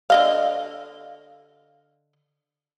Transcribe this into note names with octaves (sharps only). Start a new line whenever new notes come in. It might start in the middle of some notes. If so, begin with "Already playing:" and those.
D3 D#5 F5